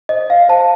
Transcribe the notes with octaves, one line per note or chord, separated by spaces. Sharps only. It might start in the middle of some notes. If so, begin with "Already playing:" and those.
C5 D#5
F5
C5 A5